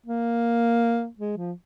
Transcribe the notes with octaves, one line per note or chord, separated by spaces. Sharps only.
A#3
G#3
F3